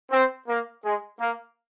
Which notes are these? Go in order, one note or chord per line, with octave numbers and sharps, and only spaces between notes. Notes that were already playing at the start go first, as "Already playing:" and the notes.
C4
A#3
G#3
A#3